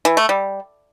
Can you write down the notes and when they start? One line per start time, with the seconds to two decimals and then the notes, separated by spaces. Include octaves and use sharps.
0.05 E3
0.17 A3
0.29 G3